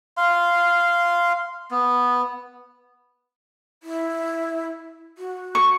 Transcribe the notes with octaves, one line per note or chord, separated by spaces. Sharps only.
F5 C6
B3
E4
F#4
C#6